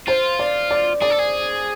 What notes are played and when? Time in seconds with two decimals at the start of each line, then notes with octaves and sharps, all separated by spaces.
0.08 F4 C5
0.39 D5
0.71 D5
1.02 G#4 D5
1.11 A4
1.19 G#4